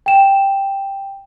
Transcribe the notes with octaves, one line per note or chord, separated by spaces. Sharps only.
G5 E7